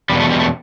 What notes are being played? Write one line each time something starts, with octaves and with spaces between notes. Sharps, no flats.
E2 B2 G3
A3
G3
A3